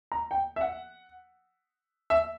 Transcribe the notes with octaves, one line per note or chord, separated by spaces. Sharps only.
A#5
G5
E5
F#5
E5